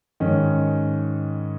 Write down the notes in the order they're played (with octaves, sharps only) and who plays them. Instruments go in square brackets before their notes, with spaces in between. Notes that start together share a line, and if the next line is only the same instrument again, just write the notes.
[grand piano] G#2 D#3 G#3 C#4